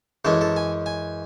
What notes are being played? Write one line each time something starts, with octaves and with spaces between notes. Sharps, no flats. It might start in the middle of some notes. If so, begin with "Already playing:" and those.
F#2 E3 G#3 C#4 A4
A4
G#5
G#5